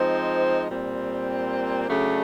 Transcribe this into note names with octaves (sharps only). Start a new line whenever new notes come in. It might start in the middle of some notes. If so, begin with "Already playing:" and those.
Already playing: F3 G#3 C4 D#4
A#2 G3 C4
C#3 F#3 A3 D4